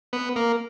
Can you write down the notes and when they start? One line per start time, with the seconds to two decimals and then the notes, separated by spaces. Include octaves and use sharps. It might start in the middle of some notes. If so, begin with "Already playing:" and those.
0.13 B3
0.36 A#3